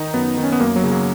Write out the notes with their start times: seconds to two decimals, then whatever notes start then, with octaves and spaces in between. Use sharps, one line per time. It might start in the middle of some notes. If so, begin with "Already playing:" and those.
Already playing: D#3 D#4
0.14 F#2 B3
0.37 D#3
0.44 C#4
0.52 B3
0.60 F#2 A#3
0.76 F#3
0.83 C#3
0.91 F#3